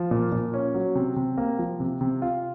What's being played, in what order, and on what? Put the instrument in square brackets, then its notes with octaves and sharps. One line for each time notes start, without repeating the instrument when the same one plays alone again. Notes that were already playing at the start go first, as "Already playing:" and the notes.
Already playing: [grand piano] F3
A#2
A#2
C#4
F#3
C3
C3
A#3
F3
C3
C3
F4